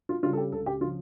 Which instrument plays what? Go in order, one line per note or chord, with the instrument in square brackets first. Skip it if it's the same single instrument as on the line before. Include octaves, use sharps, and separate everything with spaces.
[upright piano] F4
C#3 G3 F4
A4
G4
C#2 A4
G4
C#3 F3 C#4 F4